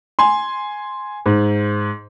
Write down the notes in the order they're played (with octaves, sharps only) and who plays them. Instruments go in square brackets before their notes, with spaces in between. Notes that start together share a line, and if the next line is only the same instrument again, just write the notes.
[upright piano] G#5 C6
G#2